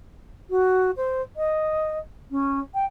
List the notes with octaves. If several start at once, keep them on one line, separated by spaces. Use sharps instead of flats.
F#4
C5
D#5
C#4
G5